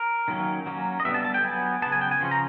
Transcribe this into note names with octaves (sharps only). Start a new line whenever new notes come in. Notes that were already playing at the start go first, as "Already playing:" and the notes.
Already playing: A#4
D#3 F#3 A#3 C#4
F#3 A#3 C#4
D#5
D3 G3 B3 E5
A5
A5
G5
F#3 B3 G#5
C#3 F#3 B3 A5
G#5
G5
G#5
C#3 F3 C#4
A#5